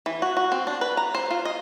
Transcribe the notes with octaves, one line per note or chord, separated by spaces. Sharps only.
E3
F#4
F#4
C4
D4
B4
A#5
C5
F4
D#5